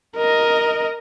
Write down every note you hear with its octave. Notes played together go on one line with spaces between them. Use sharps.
A#4 D#5